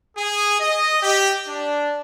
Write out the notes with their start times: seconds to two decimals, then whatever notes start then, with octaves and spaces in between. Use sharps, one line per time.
0.18 G#4
0.60 D#5
1.03 G4
1.48 D4